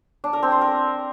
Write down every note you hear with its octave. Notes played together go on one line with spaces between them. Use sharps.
D4
A#4
C4
C5
A#4